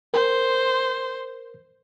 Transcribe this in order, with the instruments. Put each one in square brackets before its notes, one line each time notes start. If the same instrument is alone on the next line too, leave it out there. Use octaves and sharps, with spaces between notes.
[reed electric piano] A#4 [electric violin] C5